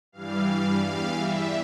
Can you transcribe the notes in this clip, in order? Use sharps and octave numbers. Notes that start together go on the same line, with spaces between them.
G2 E3 G3 F5
E2 E3 G3 F5
E5